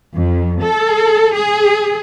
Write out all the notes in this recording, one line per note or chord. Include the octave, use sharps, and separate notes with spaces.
F2
A4
G#4